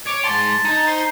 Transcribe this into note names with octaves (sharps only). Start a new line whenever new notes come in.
C#5 D6
G#2 A5 C6
D#4
C5